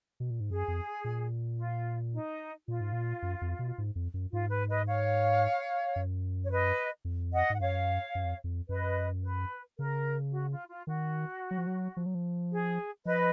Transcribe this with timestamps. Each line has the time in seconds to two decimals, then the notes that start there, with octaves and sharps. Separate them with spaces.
0.20 B2
0.30 A#2
0.40 G#2
0.50 F#2 G#4
0.68 F2
1.04 A#2
1.59 F4
2.13 D#4
2.68 A#2 F4
2.81 G#2
2.92 A#2
3.22 F#2
3.42 F2
3.59 B2
3.78 G#2
3.95 F2
4.14 F#2
4.32 G#2 F4
4.50 B4
4.69 B4 D#5
4.86 C#5 F5
5.96 F#2
6.45 C#5
6.51 B4 D#5
7.05 F2
7.33 D#5 F#5
7.50 G#2 F#5
7.60 F#2 C#5 F5
8.15 F#2
8.24 F2
8.44 F2
8.69 F#2 B4 D#5
9.23 B4
9.78 C#3 A#4
10.33 F#4
10.51 F4
10.69 F4
10.87 D#3 F#4
11.51 F#3
11.58 F3
11.67 F#3
11.97 F3
12.06 F#3
12.15 F3
12.51 G#4
13.05 F3 B4 D#5